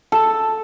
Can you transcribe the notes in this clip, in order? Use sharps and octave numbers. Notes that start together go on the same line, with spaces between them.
A4